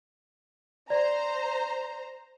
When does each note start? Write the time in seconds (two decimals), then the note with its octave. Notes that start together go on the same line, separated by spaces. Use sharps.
0.90 C5 D5 A#5